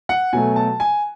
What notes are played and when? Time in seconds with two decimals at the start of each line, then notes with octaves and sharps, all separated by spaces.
0.09 F#5
0.33 B2 F#3 A3 G#5
0.56 A5
0.80 G#5